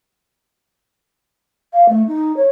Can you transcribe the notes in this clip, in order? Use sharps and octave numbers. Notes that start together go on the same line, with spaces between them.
F5
A3
D#4
C#5